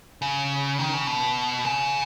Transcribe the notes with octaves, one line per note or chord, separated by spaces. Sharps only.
C#3
D#3
C#3
B2
C#3